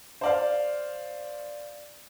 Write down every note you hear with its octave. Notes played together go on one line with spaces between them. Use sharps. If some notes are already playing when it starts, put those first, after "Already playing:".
C5 D5 F5